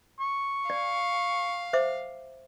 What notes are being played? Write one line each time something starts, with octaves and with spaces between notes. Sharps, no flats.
C#6
D5 F5
C5 E5 D6